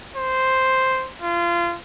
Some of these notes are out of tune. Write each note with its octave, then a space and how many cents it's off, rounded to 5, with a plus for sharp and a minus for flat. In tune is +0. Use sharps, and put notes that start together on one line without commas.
C5 +0
F4 -25